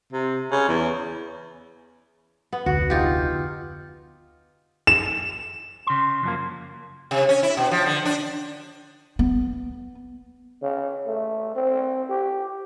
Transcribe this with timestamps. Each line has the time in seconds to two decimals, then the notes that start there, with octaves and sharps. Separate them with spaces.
0.13 C3
0.51 C#3
0.68 E2
2.52 B3
2.66 F1 D2 F#4
2.90 D#4 F4 G4
4.87 E7
5.87 C#3 C6
6.23 F#2 F3 A#3
7.11 C3
7.29 C#4
7.43 E4
7.57 B2
7.71 F3
7.86 D3
8.05 D4
9.19 B3
10.62 C#3
11.07 A3
11.55 C4
12.10 G4